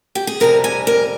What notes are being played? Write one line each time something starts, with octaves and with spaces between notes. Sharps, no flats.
G4
G#4
F2 C3 G3 A#4
G#5
A#4